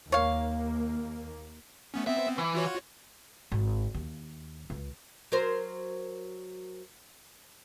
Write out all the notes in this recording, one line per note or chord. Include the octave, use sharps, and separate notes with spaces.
D#2 A#3 C#5 F5
A3 B3 C#4
B3 C4 E5
E3
F4 F#4 C#5
G#1
D#2
C#2
F#3 A#4 C5